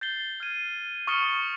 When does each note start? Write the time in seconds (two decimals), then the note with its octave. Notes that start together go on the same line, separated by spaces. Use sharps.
0.01 G6 A6 C7 G7
0.40 F6 G#6 D#7
1.07 C#6 D#6 F6 A6 C#7 G7